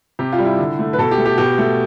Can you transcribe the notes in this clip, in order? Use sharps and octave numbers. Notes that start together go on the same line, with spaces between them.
C3 G4
F4
G3
E4
D3
A3
B4
B2 A4
G4
A3
G4
B2 G4
A3